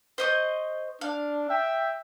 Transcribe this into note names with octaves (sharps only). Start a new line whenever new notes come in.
C5 D#5 C#6
D4 F5
E5 G5